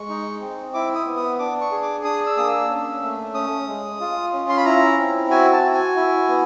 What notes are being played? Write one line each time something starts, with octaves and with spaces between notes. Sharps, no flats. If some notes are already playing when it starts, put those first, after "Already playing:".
Already playing: G#3 C#6
D#4
C4
E4 D6
D#6
B3
D#6
D4 D6
C#6
G#4
D6
D4 D#6
E6
A#3 D#6
E6
C#4
A3
C#4 D#6
G#3
F4
C#4
C6
B5
E4 A#5
C4
F#4 G#5
A5
F#4
G#5
E4
B3